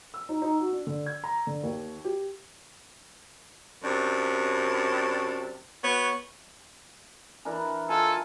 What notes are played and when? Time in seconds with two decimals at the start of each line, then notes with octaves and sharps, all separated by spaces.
0.14 E6
0.29 D#4
0.42 D#4
0.60 F#4
0.72 D4
0.87 D3
1.06 G#6
1.24 A#5
1.47 D3
1.63 D#2
2.05 G4
3.84 F#2 C3 D4
5.84 B3 F#4 C#5
7.45 E3 D4 A#4 G#5
7.89 F4 A4 F5 G#5 A5